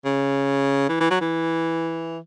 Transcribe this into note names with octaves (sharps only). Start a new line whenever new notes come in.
C#3
E3
E3
F#3
E3